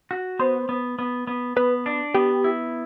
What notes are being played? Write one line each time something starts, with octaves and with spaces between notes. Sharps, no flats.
F#4
B3 C5
B3
B3
B3
B3 B4
D4
B3 G4
E4